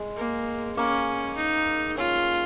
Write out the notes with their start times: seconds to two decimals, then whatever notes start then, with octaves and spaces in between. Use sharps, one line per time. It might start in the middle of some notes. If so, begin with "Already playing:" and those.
Already playing: G#3
0.17 A#3
0.76 A#3 C#4
1.36 D#4
1.97 C#4 F4